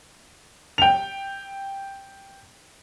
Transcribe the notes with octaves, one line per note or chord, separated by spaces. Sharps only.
G5 F7